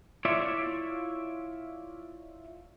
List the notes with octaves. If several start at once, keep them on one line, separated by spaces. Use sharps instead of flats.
E4 F4 C#5 D5 E5